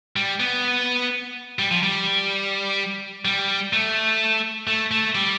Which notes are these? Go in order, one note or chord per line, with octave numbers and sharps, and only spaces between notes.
G3
B3
G3
F3
G3
G3
A3
A3
A3
G3